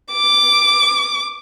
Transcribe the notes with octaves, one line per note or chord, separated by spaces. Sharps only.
D6